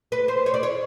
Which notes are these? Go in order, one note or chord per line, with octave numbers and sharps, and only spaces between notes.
B4
C5
C#5
D5
C#5